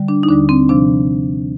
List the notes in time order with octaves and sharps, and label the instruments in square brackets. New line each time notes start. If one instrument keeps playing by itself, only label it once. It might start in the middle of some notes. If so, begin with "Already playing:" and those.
Already playing: [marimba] D3 G3
D4
D#4
D#2 D3 G3 D4
C4
C3 F3 D4